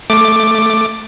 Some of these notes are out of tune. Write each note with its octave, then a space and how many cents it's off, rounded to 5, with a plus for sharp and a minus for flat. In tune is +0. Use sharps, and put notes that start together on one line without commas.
A3 +0 D6 +10